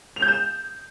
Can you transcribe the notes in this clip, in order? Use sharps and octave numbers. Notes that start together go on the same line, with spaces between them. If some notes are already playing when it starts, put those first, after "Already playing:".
F7
G6
E7